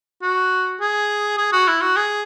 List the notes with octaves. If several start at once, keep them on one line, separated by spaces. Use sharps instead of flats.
F#4
G#4
G#4
F#4
E4
F#4
G#4